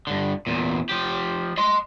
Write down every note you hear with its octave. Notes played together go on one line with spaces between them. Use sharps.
G2 D3
E2 A#2
F3 G4
D#5 C6